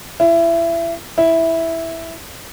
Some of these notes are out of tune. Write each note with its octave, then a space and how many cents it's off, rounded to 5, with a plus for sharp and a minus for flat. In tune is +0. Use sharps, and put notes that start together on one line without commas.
E4 +25
E4 -5